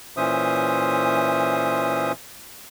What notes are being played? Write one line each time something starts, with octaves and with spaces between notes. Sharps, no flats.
A#2 E3 C#4 C5 E5 D#6